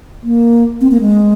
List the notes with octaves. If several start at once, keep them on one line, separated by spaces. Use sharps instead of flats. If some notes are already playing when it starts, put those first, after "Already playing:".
A#3
C4
A#3
G#3